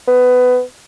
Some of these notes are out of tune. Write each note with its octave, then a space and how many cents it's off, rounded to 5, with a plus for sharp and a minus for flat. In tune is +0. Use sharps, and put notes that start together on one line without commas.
B3 +20